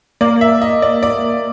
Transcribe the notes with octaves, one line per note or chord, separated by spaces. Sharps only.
A#3 D5
E5
D#5
D5
D5